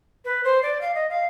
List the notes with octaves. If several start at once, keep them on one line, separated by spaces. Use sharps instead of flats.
B4
C5
D5
F5
D#5
F5